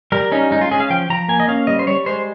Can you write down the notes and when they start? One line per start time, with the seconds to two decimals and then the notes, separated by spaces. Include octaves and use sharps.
0.12 G3 A#4
0.32 C#4 D#4
0.51 G#3 D#4
0.61 F4
0.71 C#4 G#4
0.80 F5
0.90 F3 G5
1.10 F3 A#5
1.28 A#3 G#5
1.40 D#5
1.48 C#4 F5
1.67 G3 D#5
1.79 C5
1.87 G3 C#5
2.06 G#3 C5